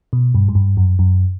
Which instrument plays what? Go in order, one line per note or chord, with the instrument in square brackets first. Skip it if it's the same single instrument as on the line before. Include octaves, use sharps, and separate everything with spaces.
[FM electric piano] B2
G2
G#2
G2
F#2
F#2